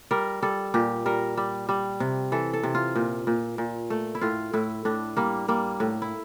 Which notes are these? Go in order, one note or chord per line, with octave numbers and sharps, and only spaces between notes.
G3 A#4
G3 A4
A#2 G4
G3 A#4
G3
G3
C3
E3 A4
A4
C3
F4
A#2
A#2
A#2
A3
E4
A2 F4
A2 E4
A2 D4
G3 A#3
G3 A#3
A2
E4